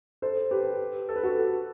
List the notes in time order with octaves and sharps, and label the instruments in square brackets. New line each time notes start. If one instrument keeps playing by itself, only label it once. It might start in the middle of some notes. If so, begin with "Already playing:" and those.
[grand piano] A4 C5
G4 B4
A4
B4
F#4 A4